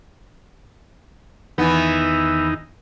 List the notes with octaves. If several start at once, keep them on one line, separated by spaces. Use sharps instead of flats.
E2 D#3 E3 B3 D#4